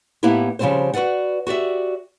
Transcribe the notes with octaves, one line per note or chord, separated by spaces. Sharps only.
A2 A#3 B3 D#4 E4 G4
C#3 F3 G3 A3 C4 C5
F#4 A4 B4 D5 F#5
F#4 G4 D5 E5